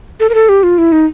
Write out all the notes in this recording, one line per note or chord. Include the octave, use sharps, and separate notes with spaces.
A4
A#4
A4
G4
F4
E4
D#4